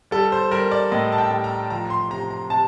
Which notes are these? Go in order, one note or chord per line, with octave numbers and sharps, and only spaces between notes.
G3 A4
C5
G3 A#4
D5
A2 D#5
A5
G5
A2
A#5
F3 A#5
C6
C3 A#5
A#5
C3 A5